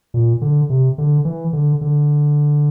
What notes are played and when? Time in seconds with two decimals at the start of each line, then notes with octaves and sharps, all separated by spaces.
0.14 A#2
0.41 D3
0.70 C3
0.98 D3
1.25 E3
1.53 D3
1.81 D3